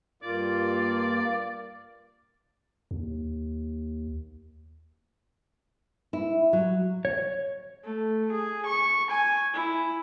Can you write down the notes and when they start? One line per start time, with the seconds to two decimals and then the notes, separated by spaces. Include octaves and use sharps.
0.23 G2 A#3 F4 D5
2.91 D#2
6.13 E4
6.53 F#3
7.05 C#5
7.84 A3
8.32 G#4
8.66 C#6
9.11 G#5
9.54 E4